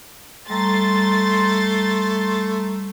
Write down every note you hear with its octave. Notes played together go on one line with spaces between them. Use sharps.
G3 A3 A#5 C6 A6